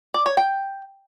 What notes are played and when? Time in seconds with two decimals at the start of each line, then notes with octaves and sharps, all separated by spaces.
0.14 D5
0.26 C#5
0.37 G5